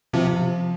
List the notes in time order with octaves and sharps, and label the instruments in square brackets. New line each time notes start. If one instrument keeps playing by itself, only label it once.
[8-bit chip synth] C3 [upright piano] F3